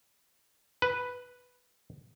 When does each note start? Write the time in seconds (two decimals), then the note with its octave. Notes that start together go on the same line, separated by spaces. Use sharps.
0.82 B4